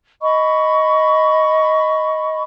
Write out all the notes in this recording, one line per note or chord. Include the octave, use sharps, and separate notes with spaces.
D#5 B5 C#6